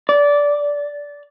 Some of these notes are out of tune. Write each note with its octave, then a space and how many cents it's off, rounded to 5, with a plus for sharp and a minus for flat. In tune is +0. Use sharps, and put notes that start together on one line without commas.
D5 -15